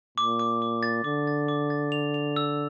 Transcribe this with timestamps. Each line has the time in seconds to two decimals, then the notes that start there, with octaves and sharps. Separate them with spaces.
0.18 A#2 D6
0.39 D6
0.62 D6
0.83 A6
1.04 D3 D6
1.27 A6
1.48 D6
1.70 A6
1.92 F7
2.14 F7
2.36 E6